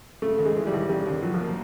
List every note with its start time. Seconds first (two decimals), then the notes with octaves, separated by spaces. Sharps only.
0.22 C#3 A3
0.39 D#2
0.45 G#3
0.57 E3
0.67 G3
0.73 D#2
0.89 C#3 G3
1.07 D#2
1.23 F#3
1.34 F3
1.39 A#3